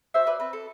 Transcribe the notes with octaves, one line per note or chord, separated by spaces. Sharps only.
F#4 C5 E5
B4 D5
C4 B4
A4